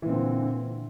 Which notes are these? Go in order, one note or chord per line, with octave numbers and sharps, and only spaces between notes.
A#2 D3 E3 C4